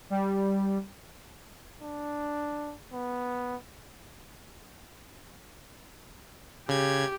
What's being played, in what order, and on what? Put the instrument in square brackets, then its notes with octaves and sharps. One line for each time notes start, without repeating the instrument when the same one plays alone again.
[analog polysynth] G3
[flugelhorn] D4
B3
[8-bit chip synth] C#3 G#6 [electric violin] G4